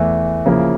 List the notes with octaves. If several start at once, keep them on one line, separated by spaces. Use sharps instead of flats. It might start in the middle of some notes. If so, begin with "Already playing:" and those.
Already playing: E2 E3 A3
C#3 F3 A#3 E4